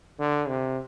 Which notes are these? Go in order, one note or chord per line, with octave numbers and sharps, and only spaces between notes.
D3
C3